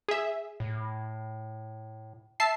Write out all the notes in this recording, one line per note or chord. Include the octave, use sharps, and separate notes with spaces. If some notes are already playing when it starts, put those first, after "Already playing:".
G#4 E5
A2
E5 A5 C7